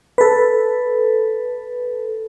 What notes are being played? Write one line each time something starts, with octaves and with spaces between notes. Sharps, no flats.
A4 B4